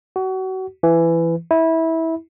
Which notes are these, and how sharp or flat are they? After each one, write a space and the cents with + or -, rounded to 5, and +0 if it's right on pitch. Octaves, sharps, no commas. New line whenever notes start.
F#4 +30
E3 +15
E4 -20